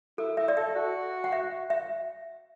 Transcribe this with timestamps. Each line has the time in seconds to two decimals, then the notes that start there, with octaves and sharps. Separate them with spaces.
0.18 E4 A4
0.37 E4 E5
0.48 D5
0.57 A4 E5
0.75 F#4
1.24 F#5
1.32 E5
1.70 E5